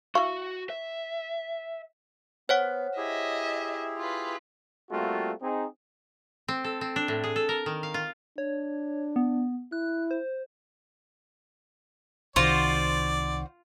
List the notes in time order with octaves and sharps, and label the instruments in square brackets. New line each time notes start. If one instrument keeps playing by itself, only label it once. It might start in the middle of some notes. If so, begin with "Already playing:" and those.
[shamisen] E4 F5 [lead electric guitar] F#4 [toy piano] C#6
[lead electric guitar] E5
[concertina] B3 [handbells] C5 C#5 F#5
[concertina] E4 G4 G#4 [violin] D#5 E5
[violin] F4 B4
[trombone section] G3 A3 A#3 C4 F4 F#4
C4 D#4 G#4
[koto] C4
A4
C4
D4
A2
G#4
A4
A#4
D#3
F5
F4
[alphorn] D4 [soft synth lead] C#5
[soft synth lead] B3
[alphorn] E4 [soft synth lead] F#6
[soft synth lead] C5
[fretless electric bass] C2 D#3 [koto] F4 [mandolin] F#4 C5 [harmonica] D5